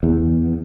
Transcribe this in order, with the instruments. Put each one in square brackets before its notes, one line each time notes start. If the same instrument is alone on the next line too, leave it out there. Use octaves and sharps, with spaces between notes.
[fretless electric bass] E2